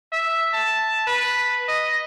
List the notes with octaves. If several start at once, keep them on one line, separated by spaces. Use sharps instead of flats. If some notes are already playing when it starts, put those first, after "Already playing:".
E5
A5
B4
D#5